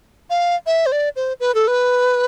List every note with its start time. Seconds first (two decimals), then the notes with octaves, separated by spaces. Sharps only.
0.30 F5
0.66 E5
0.86 C5
0.92 D5
1.16 C5
1.40 B4
1.55 A4
1.68 B4